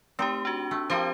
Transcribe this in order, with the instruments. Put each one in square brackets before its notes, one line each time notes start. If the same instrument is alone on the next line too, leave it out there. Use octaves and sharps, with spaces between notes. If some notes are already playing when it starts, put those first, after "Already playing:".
[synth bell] A3 G4 [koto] C4 D#4
[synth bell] D4 F#4
[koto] A3
[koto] F3 A#4 G5 [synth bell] C4 G4 C5